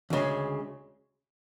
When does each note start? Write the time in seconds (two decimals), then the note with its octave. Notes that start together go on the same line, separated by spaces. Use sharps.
0.10 D2 C#3 G#3